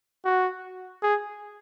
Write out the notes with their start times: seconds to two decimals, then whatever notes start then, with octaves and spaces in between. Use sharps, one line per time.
0.25 F#4
1.03 G#4